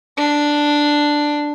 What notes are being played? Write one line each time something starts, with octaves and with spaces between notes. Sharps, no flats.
D4